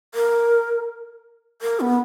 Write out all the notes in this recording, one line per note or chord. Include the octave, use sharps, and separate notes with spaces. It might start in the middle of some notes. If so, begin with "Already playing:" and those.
A#4
A#4
B3